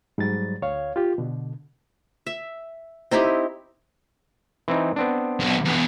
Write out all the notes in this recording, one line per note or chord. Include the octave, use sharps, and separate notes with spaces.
G#2 F#3 G3 A6
D2 C#5 F5
F4 G4
B2 D3
E5
C4 D#4 E4 G4
E3 C4 D#4
B3 C4 D4
B1 B2
E2 B2